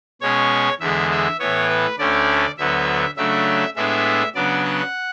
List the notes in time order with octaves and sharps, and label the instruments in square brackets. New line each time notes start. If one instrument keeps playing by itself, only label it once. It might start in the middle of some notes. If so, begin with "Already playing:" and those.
[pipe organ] B2 G#3 C#4 C#5
E2 D3 G#3 E5
E5
A2 E3 B3 C#5
B4
D2 D3 A3 C#4 D5
D2 D3 F#3 B3 E5
C#3 F#3 A3 D4 E5
A2 G#3 B3 D4 E5
C#3 F#3 B3 D4 D5
F#5